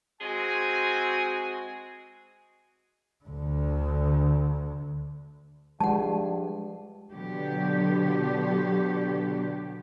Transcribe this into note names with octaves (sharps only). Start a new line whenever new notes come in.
G#3 C4 F#4 G#4 G#5
D2 D3
G2 F3 G#3 F#5 A5
B2 D3 F#3 B3 G4